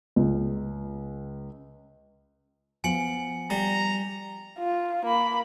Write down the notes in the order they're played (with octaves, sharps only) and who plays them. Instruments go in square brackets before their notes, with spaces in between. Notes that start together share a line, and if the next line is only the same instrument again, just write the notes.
[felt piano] C#2
[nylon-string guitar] F3 B3 F4 [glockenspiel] G#5 C#7 F#7
[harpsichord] G3 [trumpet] A#5
[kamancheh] F4
A#3 B5